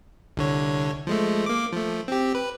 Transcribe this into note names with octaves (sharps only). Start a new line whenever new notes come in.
C2 D3 C#5
F3 G#3 A3
A#3 D6
F3 A3
C4 G4
B4